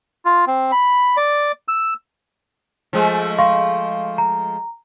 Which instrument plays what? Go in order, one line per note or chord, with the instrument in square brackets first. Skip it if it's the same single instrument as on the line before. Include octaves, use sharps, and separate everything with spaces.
[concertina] F4
C4
B5
D5
E6
[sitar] F3 G#3 A3
[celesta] F5 C6 C#6
A#5